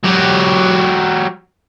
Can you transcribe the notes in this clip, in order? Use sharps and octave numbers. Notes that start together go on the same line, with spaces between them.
F#3 G4